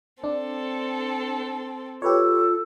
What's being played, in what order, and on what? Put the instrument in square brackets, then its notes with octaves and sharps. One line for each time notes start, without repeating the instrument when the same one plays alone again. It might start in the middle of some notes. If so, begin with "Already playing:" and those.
[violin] C4 A4 [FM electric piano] D4
[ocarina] F4 [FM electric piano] G4 B4 C#5 [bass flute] A4